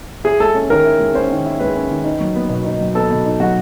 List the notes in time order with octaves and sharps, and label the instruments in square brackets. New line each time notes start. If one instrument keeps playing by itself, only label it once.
[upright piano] E4 [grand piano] G#4
[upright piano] G#3 [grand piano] A4
[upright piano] C#4
[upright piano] D#3 [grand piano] A#4
[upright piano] E4
G#3
[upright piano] C#4 [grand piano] C5
[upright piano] D#3
E4
[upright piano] G#3 [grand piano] B4
[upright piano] C#4
D#3
D#4
F#3
B3
B2
D#4
F#3
[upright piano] B3 [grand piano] A4
[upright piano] B2
D#4
[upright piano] F#3 [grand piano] F#4